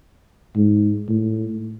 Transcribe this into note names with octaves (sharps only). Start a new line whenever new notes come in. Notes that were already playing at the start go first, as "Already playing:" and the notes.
G#2
A2